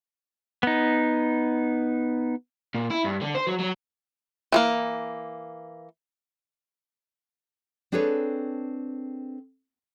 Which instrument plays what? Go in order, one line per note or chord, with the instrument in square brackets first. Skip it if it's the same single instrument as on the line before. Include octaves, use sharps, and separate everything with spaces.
[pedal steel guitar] B3 D#4
[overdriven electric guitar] A#2
E4
G2
D3
C5
F#3
F#3
[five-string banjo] E3 G#3 A#3
[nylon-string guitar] C4 D4 G#4 A4 B4 C#5